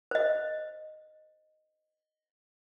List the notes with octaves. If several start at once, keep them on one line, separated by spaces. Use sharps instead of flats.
C5 D#5